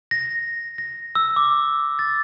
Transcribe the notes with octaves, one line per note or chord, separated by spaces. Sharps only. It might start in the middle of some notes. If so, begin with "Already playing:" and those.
A#6
A#6
E6
D6
A6